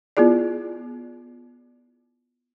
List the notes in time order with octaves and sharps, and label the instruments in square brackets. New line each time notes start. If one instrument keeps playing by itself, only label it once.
[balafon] B3 E4 F4 G#4 D5